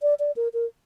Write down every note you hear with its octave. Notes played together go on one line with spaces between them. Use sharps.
D5
D5
A#4
A#4